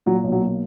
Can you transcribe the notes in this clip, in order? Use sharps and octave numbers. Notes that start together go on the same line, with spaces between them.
A#2 F#3
B1
F#3
A#3